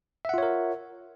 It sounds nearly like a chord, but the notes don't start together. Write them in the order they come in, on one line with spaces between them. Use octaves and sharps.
E5 F#5 F4 C#5 A#4